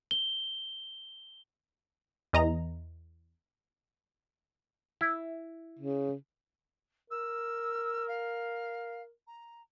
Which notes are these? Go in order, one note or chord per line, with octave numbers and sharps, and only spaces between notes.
G7
E2 D#5 A#5
E4
C#3
A#4 E6
F5
A#5